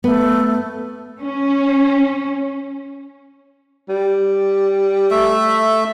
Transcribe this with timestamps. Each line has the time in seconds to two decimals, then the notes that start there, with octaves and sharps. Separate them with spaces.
0.04 A3 B3
1.19 C#4
3.89 G3
5.11 A3 E5